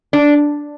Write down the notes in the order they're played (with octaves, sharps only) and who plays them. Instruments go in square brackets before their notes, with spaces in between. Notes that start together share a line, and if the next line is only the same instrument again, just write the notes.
[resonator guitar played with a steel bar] D4